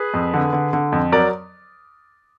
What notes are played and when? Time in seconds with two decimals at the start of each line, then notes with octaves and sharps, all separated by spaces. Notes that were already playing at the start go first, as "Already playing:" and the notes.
Already playing: G#4 B4
0.14 F2
0.34 D3
0.53 D3
0.73 D3
0.92 F2
1.12 F#3 A#4 D5